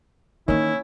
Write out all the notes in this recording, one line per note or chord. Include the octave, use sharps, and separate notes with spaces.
D#3 E3 A#3 C#4 E4